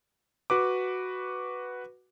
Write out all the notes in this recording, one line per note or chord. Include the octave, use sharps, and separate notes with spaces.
F#4 B4 D6